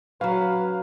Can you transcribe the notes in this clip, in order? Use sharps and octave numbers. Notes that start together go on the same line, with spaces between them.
F#3 C#4 B4 F5